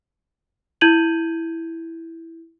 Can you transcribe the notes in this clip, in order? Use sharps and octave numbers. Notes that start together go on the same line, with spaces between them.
E4 G6 G#6 D#7 F#7